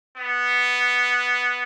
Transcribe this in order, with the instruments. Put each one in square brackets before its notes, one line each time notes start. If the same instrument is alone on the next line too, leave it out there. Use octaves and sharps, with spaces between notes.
[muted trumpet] B3